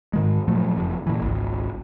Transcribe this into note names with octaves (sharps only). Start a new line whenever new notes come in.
G#2 D#3 G#3
A#2 F3 F#3 A3
F#1 F2
A#2 E3
G#1 C#2